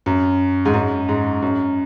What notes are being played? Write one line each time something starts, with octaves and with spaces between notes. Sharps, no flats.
F#2
G#2
F#2
G#2
F#2